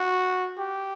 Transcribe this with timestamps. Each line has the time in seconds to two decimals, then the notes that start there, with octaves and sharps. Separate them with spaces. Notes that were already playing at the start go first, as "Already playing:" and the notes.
Already playing: F#4
0.58 G4